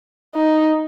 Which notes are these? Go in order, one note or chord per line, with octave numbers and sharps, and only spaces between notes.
D#4